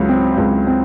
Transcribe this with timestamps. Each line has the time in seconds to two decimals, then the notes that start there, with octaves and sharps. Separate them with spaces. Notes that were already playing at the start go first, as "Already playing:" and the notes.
Already playing: C#2 F#3
0.09 C4
0.38 C#2
0.67 C4